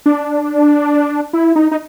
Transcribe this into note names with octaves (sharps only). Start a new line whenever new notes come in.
D4
E4
D#4
D#4